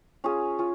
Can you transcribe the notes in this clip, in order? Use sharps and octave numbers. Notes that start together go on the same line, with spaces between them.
C#4 F4 G#4
C#4 F4